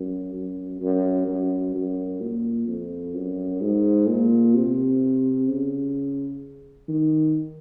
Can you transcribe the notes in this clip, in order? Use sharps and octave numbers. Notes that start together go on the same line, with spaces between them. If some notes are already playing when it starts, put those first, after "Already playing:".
Already playing: F#2
F#2
F#2
F#2
F#2
A#2
F2
F#2
G#2
A#2
C3
C#3
D#3